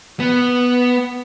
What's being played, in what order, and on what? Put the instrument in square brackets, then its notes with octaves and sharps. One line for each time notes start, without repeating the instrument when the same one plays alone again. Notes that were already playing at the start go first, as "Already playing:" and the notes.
[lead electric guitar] B3